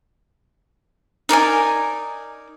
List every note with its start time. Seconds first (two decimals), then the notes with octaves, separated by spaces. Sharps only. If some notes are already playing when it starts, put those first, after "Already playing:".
1.29 D#4 A#4 D5 G#5